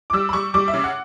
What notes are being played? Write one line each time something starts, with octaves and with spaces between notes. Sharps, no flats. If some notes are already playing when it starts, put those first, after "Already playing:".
D6
G3 E6
B5
G3 C#6
G3 D6
E5
C#3
F#5